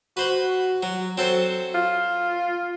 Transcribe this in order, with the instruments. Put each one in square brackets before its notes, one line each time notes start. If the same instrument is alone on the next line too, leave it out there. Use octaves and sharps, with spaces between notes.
[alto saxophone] F#4 [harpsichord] B4 C5 B5
[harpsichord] F#3
[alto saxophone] F#3 [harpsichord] C4 A4 C5
[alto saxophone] F4